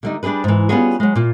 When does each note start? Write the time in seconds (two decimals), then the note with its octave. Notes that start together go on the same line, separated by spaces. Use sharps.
0.03 D3 G3 D#4
0.23 G3 D4 G4 G#4 B4
0.44 G#2 E3
0.69 G3 B3 C#4 F4 F#4 G#4
1.00 F#3 G#3
1.15 A#2 F4